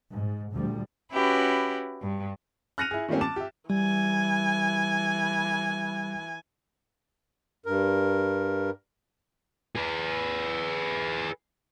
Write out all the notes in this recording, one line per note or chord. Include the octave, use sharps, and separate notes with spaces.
G#2
D2 A#2 F3 G3
C#4 E4 F#4 G4 B4
G2
F6 F#6 A#6 C#7 D#7 F7
E4 G#4
D#3 G3 A3 A#3 C4 C#4
A5 D6 A6 E7
G4 E5
E3 G3 G#5
G2 A#4
G#4 B4